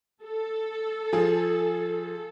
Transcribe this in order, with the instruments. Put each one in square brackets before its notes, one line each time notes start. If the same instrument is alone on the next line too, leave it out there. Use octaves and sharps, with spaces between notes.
[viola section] A4
[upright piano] F3 G#4